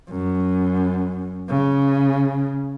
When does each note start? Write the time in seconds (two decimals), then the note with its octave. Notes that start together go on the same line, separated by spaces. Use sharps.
0.10 F#2
1.50 C#3